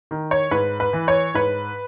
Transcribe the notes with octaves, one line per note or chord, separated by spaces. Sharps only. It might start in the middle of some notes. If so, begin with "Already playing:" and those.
D#3
C#5
G#2 B4
B4
E3
C#5
G#2 B4